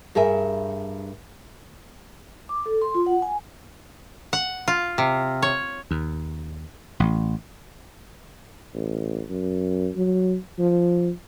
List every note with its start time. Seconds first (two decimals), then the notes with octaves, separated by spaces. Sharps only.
0.15 G2 G#4 A#4 E5 G#5
2.49 D6
2.66 A4
2.81 C6
2.95 F4
3.06 F#5
3.22 G#5
4.33 F#5
4.68 F4
4.98 C3
5.42 C#5
5.91 D#2
7.00 A1
8.74 A1
9.29 F#2
9.96 F#3
10.59 F3